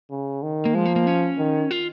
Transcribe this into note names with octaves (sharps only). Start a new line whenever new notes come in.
C#3
D#3
A#3
F3 G#3
A#3
A#3
C#4
D#3
F4